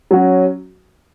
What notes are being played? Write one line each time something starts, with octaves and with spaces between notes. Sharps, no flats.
F#3 C#4 F#4